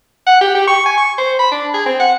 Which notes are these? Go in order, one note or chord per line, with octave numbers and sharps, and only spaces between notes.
F#5
G4
G4
C#6
G#5
C#6
C5
B5
D4
G#4
C4
F#5